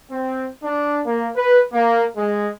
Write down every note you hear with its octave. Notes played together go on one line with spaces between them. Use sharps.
C4
D4
A#3
B4
A#3
G#3